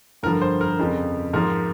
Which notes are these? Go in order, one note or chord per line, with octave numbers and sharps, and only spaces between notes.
G2 D3 F3 A#4
C5
A#4
F2 C#3 F3
G#2 F3 A#4